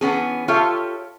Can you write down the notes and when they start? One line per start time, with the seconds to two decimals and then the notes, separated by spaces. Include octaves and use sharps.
0.01 E3 B3 C#4 G#4
0.48 F4 G4 A4 C#5 E5